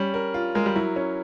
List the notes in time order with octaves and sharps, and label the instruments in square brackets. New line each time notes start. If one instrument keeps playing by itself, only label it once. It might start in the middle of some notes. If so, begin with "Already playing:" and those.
Already playing: [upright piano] G3 [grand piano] C#4
[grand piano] A#4
F4
[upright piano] G#3 [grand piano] A#4
[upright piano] G3
[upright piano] F#3 [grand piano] E4
[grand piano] C#4